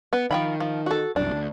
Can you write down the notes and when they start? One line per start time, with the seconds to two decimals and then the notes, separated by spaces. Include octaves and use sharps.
0.13 B3
0.31 D#3 F3 G5 B5
0.60 F3
0.86 F#4 A4
1.16 C2 F#2 D4
1.31 D2